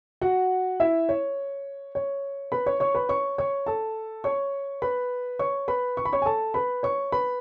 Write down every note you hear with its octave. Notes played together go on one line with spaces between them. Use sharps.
F#4 F#5
E4 E5
C#5
C#5
B4 B5
C#5 C#6
C#5 C#6
B4 B5
C#5 C#6
C#5 C#6
A4 A5
C#5 C#6
B4 B5
C#5 C#6
B4 B5
C#6
B5
C#5 C#6
G#5
A4 A5
B4 B5
C#5 C#6
B4 B5